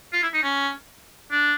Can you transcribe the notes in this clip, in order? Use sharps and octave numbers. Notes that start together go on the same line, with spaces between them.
F4
E4
D#4
C#4
D4